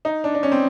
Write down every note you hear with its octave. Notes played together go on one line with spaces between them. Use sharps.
D#4
D4
D4
C#4
C4